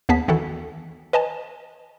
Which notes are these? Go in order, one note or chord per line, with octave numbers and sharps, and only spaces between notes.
D#2 B3 G#4 A5 B6
D#3 E3 F#4 A4
B4 D#5 G#5 A5